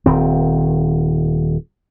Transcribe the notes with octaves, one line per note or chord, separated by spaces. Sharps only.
D#1 D#3 C4